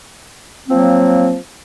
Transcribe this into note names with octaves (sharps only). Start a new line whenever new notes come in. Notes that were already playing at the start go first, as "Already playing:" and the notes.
F3 F#3 A#3 C4